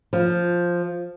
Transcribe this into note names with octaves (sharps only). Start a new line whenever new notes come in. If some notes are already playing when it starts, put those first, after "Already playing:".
F3